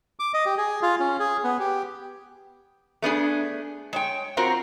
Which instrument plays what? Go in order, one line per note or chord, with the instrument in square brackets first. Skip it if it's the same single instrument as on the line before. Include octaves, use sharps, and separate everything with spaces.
[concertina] D6
D#5
G4
G#4
F4
C#4
G#4
B3
G4
[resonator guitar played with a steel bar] A3 B3 D4 G#4
G#3 C#5 G5
C4 F4 F#4 A#4 C5 F#5